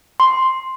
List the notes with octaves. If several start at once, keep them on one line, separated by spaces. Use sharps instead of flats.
C6